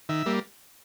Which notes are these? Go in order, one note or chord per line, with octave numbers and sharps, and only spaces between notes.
D#3 E5
G3 A#3